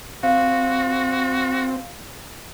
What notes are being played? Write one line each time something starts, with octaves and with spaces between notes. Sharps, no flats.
C4 F#4 F5